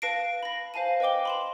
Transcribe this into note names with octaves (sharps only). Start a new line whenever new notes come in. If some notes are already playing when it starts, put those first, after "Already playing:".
B4 F5 A5 A#6 C7 D7
B5 A#6
C5 F5 G#5 A5 D#7
B4 D#5 G5 D6 G7
B5 C6 E7